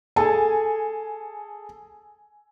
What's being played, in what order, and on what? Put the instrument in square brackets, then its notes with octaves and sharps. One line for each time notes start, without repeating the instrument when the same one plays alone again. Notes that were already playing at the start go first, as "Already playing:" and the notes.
[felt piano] G#4 A4 A5 [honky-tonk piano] G#5